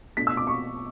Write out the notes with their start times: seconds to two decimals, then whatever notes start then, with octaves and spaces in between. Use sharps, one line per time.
0.17 B2 A3 D4 B6
0.27 E6
0.37 D6
0.47 C#6